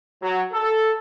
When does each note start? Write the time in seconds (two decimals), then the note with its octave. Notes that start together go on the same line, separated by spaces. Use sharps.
0.23 F#3
0.53 A4